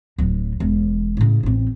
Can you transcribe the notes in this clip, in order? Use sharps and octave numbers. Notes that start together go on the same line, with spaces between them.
D1 F#3
E1
A2 C#3
A1 C4